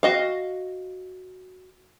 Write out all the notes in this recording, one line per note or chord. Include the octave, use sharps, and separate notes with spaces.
F#4 D#5 F5